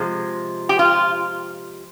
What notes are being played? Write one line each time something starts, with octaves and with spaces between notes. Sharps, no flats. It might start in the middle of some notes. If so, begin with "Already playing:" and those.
Already playing: C3 F3 G#3
G4
F4